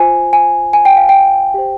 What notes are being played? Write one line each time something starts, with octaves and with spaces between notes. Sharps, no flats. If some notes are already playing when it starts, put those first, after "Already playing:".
Already playing: F4 C5 G#5
G#5
G#5
G5
F5
G5
G4 C5